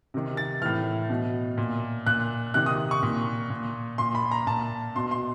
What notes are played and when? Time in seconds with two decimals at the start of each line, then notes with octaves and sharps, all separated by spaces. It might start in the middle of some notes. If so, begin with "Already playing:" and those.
0.14 C3 D#3
0.37 A6
0.61 A2 E3 F6
1.10 B2
1.58 A#2
2.07 A#2 F#6
2.54 C3 D#3 F#6
2.66 D#6
2.91 C#6
3.03 A#2
3.50 A#2
3.98 A#2 C6
4.15 B5
4.31 A#5
4.47 A#2 A5
4.95 B2 C6
5.11 C6